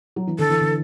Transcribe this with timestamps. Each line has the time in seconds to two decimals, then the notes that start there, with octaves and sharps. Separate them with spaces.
0.16 F#3
0.27 E3
0.39 D3 A4
0.50 E3
0.61 D3